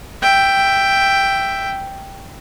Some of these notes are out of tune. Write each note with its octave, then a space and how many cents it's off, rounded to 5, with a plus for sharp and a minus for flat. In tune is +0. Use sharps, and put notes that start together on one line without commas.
E5 +10 G5 +0